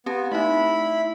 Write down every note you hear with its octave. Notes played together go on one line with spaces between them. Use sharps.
B3 C4 G4 A5
A3 D#4 E4 B5